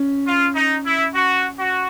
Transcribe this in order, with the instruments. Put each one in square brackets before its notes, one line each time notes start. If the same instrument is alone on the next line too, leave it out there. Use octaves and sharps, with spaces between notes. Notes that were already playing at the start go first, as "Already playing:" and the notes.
Already playing: [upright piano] C#4
[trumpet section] F4
D#4
E4
F#4
F#4